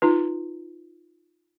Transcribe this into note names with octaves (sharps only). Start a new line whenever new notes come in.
D#4 F4 B4